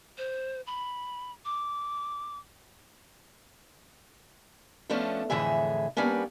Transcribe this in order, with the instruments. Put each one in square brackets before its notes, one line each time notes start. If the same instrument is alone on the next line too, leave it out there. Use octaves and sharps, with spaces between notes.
[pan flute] C5
B5
D6
[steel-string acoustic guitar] F3 A3 B3 C#4 D4
F2 A2 D3 E3 G#4 E5
G3 A#3 B3 C#4 D4